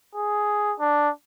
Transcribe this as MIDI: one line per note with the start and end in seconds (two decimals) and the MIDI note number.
0.15 0.75 68
0.80 1.10 62